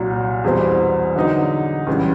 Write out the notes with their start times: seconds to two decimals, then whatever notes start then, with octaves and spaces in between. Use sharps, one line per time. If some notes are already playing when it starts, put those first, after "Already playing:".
Already playing: C2 A#2 F#3
0.44 E2 B2 G3 C4
1.16 D3 F#3 B3 D#4
1.87 C#2 C#3 E3 G3